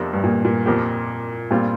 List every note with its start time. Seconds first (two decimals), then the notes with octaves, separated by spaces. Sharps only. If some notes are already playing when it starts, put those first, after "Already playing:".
Already playing: F2 C3 A#3 D4
0.13 G2
0.24 A#2
0.45 A#2
0.66 F2 F3 A#3 G4
1.51 G2 A#2 G3 C4 F4